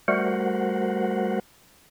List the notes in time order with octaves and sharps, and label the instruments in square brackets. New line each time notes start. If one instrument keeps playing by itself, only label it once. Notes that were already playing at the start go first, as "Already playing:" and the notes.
[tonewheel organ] G3 A3 F#4 A#4 C5 F#5